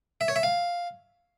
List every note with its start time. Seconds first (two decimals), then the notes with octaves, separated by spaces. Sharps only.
0.21 E5
0.28 C#5
0.36 E5
0.43 F5